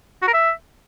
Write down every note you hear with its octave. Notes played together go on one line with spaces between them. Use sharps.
F#4
A#4
E5